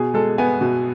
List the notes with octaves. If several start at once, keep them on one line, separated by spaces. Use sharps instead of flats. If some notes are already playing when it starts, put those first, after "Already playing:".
Already playing: B2 G#4
G#3 A4
B3 G#5
B2